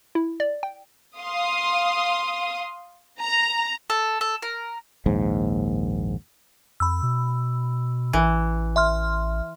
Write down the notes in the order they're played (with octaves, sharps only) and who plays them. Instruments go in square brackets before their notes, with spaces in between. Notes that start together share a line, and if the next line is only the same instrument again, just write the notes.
[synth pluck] E4
D5
G5
[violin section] F5 C6 D#6
A#5
[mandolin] A4
A4
A#4
[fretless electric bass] A#1 D#2 G#2
[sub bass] F2 [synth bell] B5 E6
[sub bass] B2
[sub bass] A1 [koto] E3
[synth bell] E5 C6 F6